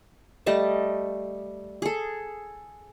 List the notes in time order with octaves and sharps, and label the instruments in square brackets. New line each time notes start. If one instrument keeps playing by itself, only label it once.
[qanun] G3 A3 D#5 A5
G#4 A4